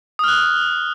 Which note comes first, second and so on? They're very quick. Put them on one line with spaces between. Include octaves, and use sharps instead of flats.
D#6 F6 F#6